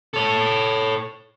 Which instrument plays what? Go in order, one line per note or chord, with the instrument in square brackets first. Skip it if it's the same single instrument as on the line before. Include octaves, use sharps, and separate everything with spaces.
[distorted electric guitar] A4 C#5